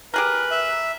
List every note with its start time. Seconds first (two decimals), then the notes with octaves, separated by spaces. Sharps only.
0.14 G4 G#4 A#4 B4
0.51 E5